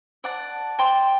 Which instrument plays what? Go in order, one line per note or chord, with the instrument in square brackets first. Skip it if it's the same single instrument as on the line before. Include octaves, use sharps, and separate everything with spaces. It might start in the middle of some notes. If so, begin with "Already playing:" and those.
[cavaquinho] D5 F#5 A5
D5 G5 C6